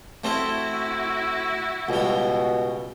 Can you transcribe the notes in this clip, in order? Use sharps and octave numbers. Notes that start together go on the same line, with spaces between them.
A3 C4 E4 F#4
C#2 B2 G3